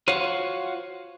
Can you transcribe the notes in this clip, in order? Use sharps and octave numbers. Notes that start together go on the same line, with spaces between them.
F4 F#4 C5 C#5 F5 F#5